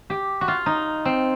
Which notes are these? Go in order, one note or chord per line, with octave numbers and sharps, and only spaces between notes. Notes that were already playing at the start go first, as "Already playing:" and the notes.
G4
F#4
F4
D#4
C4